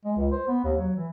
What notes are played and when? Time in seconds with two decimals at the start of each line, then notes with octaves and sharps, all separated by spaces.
0.05 G#3
0.17 C#2
0.32 C5
0.48 B3
0.64 D#2
0.78 F#3
0.96 E3